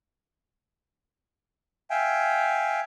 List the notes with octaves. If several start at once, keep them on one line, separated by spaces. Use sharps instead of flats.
E5 F5 G5 G#5